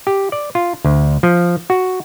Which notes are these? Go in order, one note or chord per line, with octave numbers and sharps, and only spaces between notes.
G4
D5
F4
D2
F3
F#4